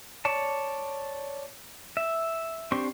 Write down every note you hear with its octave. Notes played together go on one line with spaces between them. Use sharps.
C#5 D5 A5
E5
C4 D4 G4 C5 C#6